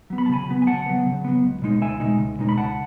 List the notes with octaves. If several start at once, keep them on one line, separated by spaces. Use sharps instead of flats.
F#3 B3
B5
A5
C#3 G#5 B5
F#3 B3
G#5
C#3 F#5 A5
F#3 B3
C#3
F#3 B3
C#2
B2 G#3 D#4
C#2 E5 G#5
B2 G#3 D#4
C#2
B2 G#3 D#4
B5
C#2 F#5 A5